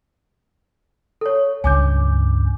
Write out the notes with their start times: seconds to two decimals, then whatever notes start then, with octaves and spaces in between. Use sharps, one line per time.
1.21 A4 C#5
1.64 C#2 G2 G#5 D6 G6